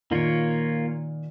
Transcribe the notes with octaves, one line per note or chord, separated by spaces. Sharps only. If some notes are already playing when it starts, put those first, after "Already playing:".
A#2 D#3 A#3 F4 A#4 C#5